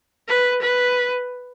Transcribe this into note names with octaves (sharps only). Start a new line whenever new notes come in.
B4
B4